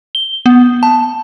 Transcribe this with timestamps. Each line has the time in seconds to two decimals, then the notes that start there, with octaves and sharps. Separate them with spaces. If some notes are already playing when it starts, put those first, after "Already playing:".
0.15 G7
0.46 B3
0.83 A5